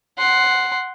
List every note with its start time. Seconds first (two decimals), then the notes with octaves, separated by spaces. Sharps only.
0.18 F#5 C6